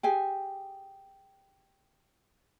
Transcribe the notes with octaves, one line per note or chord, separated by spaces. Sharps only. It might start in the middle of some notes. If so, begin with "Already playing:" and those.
G4 G#4 G#5